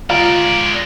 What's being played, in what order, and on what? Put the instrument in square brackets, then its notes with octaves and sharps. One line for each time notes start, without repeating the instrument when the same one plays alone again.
[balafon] D3 F4 D#5 [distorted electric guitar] G#3 D5 [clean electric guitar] F5 A#5